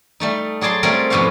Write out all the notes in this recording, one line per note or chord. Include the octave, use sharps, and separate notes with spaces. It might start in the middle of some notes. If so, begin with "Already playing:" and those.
G3 A3 D#4
F#3 G#4 D5 A5 C6
G3 A3 C4 F4 G#4 A#4
F2 G#2 B2 G4 C#5 F5